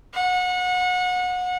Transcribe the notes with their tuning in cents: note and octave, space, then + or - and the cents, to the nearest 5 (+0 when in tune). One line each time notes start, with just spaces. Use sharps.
F#5 -30